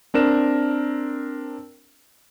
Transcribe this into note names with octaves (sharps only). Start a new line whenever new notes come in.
C4 D4 A#4 E7